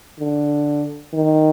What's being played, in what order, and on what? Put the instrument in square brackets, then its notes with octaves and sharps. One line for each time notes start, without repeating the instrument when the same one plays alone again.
[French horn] D3
D#3